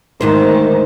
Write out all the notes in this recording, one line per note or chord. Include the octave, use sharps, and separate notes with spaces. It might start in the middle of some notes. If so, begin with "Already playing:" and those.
D2 G#2 D#3 C5